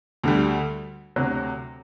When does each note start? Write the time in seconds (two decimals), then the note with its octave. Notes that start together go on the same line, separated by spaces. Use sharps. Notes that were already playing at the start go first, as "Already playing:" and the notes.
0.23 D2 D3 G3
1.16 D2 C3 F#3